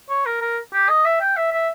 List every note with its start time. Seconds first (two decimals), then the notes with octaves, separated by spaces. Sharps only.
0.09 C#5
0.26 A#4
0.41 A#4
0.73 G4
0.89 D#5
1.05 E5
1.21 G5
1.37 E5
1.52 E5